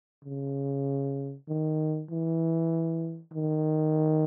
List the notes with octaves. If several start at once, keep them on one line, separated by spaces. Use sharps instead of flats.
C#3
D#3
E3
D#3